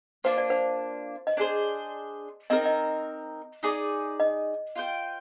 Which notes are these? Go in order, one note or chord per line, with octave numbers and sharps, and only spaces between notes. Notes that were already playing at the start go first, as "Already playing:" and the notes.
A#3 D4 F4 C5
D5
C5
D#5
D4 G#4 C5 D5
C4 D#4 A#4 D#5
D#5
D#4 G#4 D5
D#5
F4 C5 G5